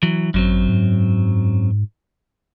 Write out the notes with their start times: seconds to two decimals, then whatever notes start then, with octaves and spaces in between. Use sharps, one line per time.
0.03 E3 F#3
0.34 G#1 F#2 F#3 C4
0.69 G#2